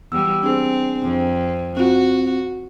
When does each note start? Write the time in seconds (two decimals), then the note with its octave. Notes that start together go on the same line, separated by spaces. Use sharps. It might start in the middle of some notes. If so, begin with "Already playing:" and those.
0.12 E2 G3 E6
0.43 C4 D4 G#4
1.03 F2
1.77 C4 F4 F#4